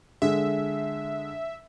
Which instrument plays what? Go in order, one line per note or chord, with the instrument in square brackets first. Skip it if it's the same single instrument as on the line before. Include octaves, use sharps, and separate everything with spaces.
[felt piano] D3 G#3 [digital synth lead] E5